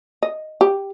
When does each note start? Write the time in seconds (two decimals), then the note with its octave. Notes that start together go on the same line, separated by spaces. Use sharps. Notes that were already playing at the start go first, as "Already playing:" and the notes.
0.23 D#5
0.61 G4